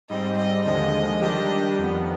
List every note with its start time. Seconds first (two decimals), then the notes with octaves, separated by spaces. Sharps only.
0.09 G#2 G3 C4 D#5
0.37 D#5
0.65 D#2 D3 F3 G#3 D#5
1.22 D#3 G3 D4 G4 D#5
1.78 F2 D#3 B3